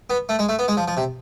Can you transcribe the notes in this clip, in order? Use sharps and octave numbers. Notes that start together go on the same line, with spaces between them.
B3
A3
G#3
A3
B3
G#3
F3
F3
C3